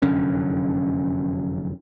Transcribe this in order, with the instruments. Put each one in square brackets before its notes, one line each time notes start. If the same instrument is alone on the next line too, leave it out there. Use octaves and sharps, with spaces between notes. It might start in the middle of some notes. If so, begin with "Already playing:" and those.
[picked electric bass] F1 F#2 D3 C#4